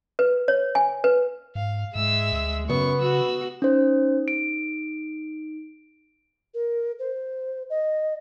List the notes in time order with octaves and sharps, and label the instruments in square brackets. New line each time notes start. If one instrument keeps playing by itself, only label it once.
[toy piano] B4
C#5
G#5
B4
[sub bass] G#2 [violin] F5
[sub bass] G#2 [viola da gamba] G#3 [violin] E5 E6
[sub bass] D2
[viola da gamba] F#2 [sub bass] C#3 [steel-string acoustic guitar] B3 [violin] C#6
[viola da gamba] F#4 [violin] E6
[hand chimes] C#4 C5 [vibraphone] D#4
[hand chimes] D7
[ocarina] A#4
C5
D#5